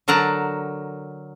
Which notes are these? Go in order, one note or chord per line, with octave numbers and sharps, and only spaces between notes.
D3 F#3 A#4 F#5 A5 A#5